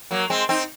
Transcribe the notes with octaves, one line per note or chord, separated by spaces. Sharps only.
F#3 A#3
G#3 C4
C4 D#4